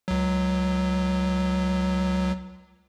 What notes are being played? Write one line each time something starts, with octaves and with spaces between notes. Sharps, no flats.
C#2 F#3